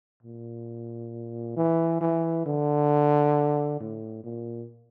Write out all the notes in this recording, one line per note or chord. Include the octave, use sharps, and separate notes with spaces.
A#2
E3
E3
D3
A2
A#2